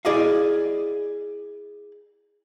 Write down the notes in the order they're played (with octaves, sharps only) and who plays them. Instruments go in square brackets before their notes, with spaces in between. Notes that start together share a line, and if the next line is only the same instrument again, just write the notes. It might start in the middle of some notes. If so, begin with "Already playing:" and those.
[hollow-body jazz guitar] E4 G#4 D5 D#5 F5